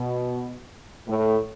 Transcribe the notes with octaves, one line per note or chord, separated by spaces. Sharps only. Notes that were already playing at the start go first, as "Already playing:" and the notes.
Already playing: B2
A2